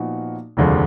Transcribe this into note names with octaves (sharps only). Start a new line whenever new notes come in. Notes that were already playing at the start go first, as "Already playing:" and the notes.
Already playing: A#2 F3 B3 D#4 F#4
F1 D#2 D3 F3 G#3